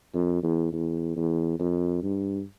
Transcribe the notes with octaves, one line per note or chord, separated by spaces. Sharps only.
F2
E2
E2
E2
F2
G2